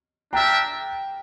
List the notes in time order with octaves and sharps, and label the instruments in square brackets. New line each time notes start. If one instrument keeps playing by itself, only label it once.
[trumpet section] D4 G4 A#4 E5 [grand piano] G5 A#5